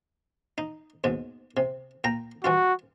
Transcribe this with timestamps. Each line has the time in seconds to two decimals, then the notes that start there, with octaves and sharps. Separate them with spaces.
0.58 D#4
1.04 D#2 G#2 B2
1.57 C3
2.04 A#2 G5 A#5
2.44 E3 G3 F4 F#4